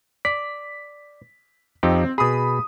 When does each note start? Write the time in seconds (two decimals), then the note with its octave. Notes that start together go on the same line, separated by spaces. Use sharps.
0.25 D5 B6
1.83 F2 C4 D#4 G4
2.18 B2 G#4 B5 D#6